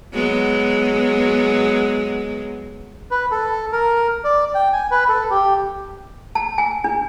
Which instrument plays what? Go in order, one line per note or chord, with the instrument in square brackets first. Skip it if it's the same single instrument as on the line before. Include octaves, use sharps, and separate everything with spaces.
[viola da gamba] F#3 G#3 B3
[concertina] B4
A4
A#4
D5
G5
G#5
B4
A4
G4
[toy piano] A5
G#5
D4